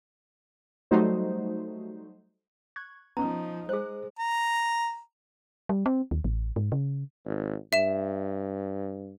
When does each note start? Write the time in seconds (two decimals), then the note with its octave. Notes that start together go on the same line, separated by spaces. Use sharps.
0.91 F#3 G3 A3 D#4 F#4 C5
2.76 C#6 F#6 G#6
3.17 F3 B3 C#4 D#4 A#5
3.69 G#3 G#4 C5 F#6
4.19 A#5
5.69 G3
5.86 C4
6.11 D#2
6.24 A1
6.56 G#2
6.72 C#3
7.26 G#1
7.73 G2 E5 E7